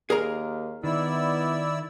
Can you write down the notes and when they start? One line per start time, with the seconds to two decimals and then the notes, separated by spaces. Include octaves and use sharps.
0.10 D#2 G#4 A#4 A#5
0.84 D#3 B3 E4 D5 E6